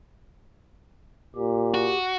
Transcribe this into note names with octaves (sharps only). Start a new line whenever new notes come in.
A#2 G4
F#4